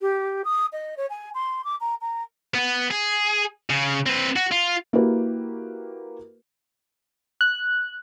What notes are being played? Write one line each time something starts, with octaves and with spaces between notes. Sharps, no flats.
G4
D#6
D#5
C#5
G#5
C6
D6
A#5
A#5
B3 B4
G#4
C#3
C4 B4
F#4
F4
A#3 E4 F#4 G4 A#4 B4
F#6